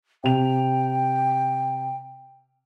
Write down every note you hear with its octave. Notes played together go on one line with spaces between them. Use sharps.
C3 G5 F7